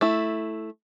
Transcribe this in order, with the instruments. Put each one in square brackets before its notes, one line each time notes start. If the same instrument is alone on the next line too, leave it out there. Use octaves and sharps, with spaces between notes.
[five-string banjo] A3 E4